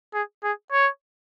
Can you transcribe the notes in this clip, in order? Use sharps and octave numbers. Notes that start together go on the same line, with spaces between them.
G#4
G#4
C#5